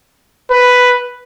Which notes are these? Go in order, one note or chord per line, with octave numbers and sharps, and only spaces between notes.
B4